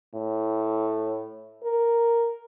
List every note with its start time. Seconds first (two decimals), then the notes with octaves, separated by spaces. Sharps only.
0.14 A2
1.63 A#4